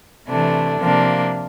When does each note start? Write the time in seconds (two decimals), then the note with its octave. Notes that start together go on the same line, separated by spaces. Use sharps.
0.28 C3 E3 A3 D4
0.80 C3 F3 A#3 D4